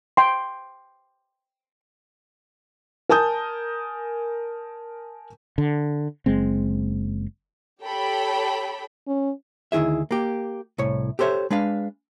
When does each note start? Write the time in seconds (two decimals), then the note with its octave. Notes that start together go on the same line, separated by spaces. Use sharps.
0.17 G5 C6
3.09 A#4 G#5 A5 D#6 G6
5.58 D3
6.26 F#1 G#3 C4
7.83 G4 A4 C#5 G5 B5
9.07 C#4
9.72 D2 D#3 E4 G#4 E5
10.11 A#3 G4
10.78 C2 A2 C#5
11.19 G4 A4 C5 C#5 E5
11.50 G#3 D4 B4 F5